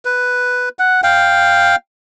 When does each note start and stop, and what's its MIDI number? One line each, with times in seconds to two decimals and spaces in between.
0.05 0.69 71
0.79 1.01 78
1.03 1.76 77
1.03 1.76 79